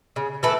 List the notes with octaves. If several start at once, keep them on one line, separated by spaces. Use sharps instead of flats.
C#3
E3 A3 A4 B4